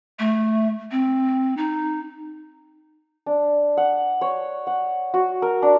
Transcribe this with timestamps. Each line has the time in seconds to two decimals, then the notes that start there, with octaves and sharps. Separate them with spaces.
0.19 A3
0.91 C4
1.57 D#4
3.26 D4
3.77 F#5
4.21 C#5
4.67 F#5
5.14 F#4
5.42 A#4
5.62 D4